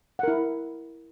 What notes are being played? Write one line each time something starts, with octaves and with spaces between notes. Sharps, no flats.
E4 A#4 F#5